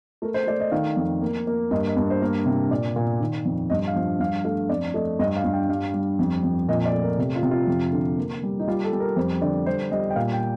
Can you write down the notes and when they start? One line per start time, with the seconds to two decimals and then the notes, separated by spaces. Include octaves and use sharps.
0.22 A3 A#4
0.34 C5
0.47 A3 D5
0.60 D#5
0.72 D#3 F5
0.97 F2
1.21 A#3
1.47 A#3
1.71 G2 D#5
1.88 D#5
1.97 G2
2.10 C5
2.21 A#3 A#4
2.46 C3
2.70 A#2 D5
2.96 A#2
3.21 D#3
3.45 F2
3.70 G2 D#5
3.88 F5
3.96 F3
4.20 G2 F5
4.45 A3 F5
4.69 F2 D5
4.94 A3 D#5
5.19 G2 D#5
5.36 F5
5.44 G2
5.53 G5
5.69 G3 F5
5.94 G3
6.19 F2
6.43 F2
6.69 A#2 D#5
6.85 D5
6.93 A3
7.02 A#4
7.18 C3
7.35 F4
7.43 C3
7.51 F4
7.67 F2
7.92 D3
8.17 A#3
8.43 G3
8.60 D#4
8.68 G3 F4
8.84 A4
8.93 G3
9.00 A#4
9.16 F2 C5
9.41 D3 D5
9.66 G3 C5
9.91 G3 D#5
10.10 G5
10.16 A#2 F5
10.33 G5